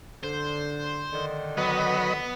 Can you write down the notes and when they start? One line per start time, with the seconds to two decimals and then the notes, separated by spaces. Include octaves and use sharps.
0.23 D3 C5
1.13 D3 D#3
1.58 F#3 B3 B4 D#5